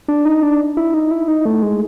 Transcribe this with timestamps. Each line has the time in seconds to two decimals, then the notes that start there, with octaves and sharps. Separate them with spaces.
0.08 D4
0.25 D#4
0.43 D4
0.77 E4
0.94 D#4
1.11 E4
1.28 D#4
1.45 A3
1.63 G#3